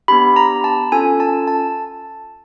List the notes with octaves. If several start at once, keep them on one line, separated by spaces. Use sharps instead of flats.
B3 D4 G4 B5
A#5
A5
C#4 F4 A4 G#5
A5
A5